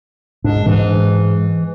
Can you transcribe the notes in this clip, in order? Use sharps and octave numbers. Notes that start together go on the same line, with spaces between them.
G#2 D4
G#2 E3